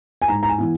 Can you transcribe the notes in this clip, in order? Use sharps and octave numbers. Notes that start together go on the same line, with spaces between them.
G#5
G#2 A#5
A#5
G#5
E3 B3 E4